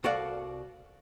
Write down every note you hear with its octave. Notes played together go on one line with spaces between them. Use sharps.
C2 F#4 A4 D5 F5 F#5